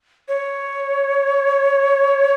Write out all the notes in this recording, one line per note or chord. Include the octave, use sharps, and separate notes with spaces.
C#5